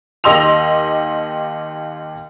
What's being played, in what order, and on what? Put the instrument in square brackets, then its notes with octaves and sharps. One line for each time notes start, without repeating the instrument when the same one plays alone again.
[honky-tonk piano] D#2 G4 D#5 C6 E6 F7